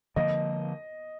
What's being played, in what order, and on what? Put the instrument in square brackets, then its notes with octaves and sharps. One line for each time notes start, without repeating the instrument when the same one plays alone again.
[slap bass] D3 F3 A#3 [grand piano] D#5